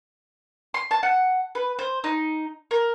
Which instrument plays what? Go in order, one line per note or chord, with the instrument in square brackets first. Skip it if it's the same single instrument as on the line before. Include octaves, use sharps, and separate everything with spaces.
[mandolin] C6
A5
F#5
B4
C5
D#4
A#4